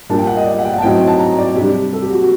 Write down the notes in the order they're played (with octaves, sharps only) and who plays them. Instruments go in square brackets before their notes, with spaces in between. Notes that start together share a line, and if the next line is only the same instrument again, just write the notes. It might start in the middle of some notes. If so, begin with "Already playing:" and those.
[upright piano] A#2 G3 A#3 D4 A5
G5
F#5
D#5
D5
F#5
G5
F#5
A5
A2 F#3 C4 D#4 G5
A5
A#5
D5
C3 G3 D4 G4
A4
G4
F#4
F#4